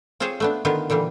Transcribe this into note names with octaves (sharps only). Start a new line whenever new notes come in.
C4 F4 G#4 C5 C#5 F5
A3 B3 D4
D3 D#3 B3 F4
A#2 D3 E3 G3